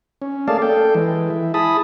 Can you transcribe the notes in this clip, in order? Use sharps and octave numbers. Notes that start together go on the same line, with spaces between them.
C#4
A3 A#3 G#4 D5 F5 A5
A4 G5
E3 G#3
E4
E4 G#4 A5 B5 D#6